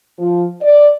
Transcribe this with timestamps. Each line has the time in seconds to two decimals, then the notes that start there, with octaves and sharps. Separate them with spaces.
0.18 F3
0.62 D5